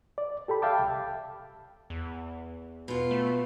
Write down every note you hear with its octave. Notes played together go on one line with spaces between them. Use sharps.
D5
G4 A4 G5 B5
E5 F5 G5 A5 D6
C2
E2
B2 F4
A3